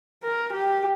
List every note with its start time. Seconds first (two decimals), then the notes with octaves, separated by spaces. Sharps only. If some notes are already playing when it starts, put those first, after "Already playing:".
0.23 A#4
0.52 G4